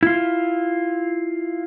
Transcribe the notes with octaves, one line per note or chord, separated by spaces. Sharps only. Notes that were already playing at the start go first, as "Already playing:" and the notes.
E4 F4